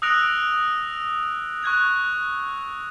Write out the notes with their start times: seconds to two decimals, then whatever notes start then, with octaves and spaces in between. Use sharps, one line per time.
0.02 D#6 E6 F#6 A#6 D7 F7
1.63 C#6 F#6 G#6 F7